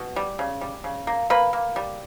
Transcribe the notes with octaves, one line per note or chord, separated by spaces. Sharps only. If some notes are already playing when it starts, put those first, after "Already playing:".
Already playing: B2
G3
C#3
G3
C#3
A#3
A#3 B4 B5
A#3
G3